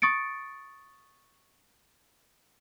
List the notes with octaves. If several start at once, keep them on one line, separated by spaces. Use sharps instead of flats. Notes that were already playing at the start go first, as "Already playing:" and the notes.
C#6 D#6 A6 C#7 D7